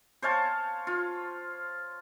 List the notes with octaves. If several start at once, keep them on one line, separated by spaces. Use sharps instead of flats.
C5 C#5 F5 A5
F4